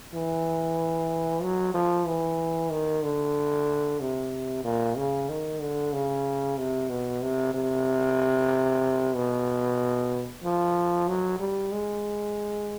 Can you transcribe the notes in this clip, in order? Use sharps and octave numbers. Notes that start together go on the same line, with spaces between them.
E3
F#3
F3
E3
D#3
D3
C3
A#2
C#3
D#3
D3
C#3
C3
B2
C3
C3
B2
F3
F#3
G3
G#3